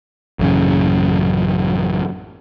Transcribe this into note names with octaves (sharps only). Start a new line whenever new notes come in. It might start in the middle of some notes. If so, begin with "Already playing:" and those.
A1 F#2 C#3